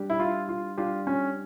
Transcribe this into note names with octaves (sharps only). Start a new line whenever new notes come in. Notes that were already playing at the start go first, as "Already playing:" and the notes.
Already playing: G3 D4 G4
E4
F4
F4
G3 D4 F4 G4
C#4